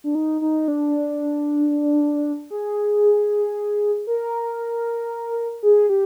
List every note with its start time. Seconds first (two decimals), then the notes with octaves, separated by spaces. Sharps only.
0.04 D4
0.15 D#4
0.41 D#4
0.68 D4
2.51 G#4
4.07 A#4
5.63 G#4
5.89 G4